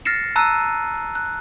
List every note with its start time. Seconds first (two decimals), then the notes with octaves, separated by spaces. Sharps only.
0.05 F6 A6 A#6 C7 C#7 E7
0.36 A5 A#5 E6 F#6 D#7
1.15 F#6